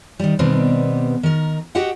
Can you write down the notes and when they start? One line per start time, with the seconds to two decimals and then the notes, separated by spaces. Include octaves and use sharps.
0.19 D#3 G3
0.39 B2 D#3 G3 B3 C4 D5
1.23 D#3 A#4
1.75 F#4 G4 D#5 F#5 G5